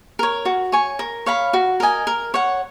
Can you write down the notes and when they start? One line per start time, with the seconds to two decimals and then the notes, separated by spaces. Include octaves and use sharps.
0.19 A#4 C#5
0.45 F#4
0.72 C#5 G#5 C#6
0.99 A#4
1.26 C#5 F5 B5
1.53 F#4
1.80 A#4 D#5 G#5
2.07 A#4
2.34 C#5 F#5